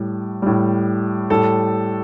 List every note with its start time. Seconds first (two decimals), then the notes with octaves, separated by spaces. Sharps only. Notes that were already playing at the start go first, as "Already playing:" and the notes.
Already playing: A2 G3
0.42 A2 G3
1.30 A2 G3 A4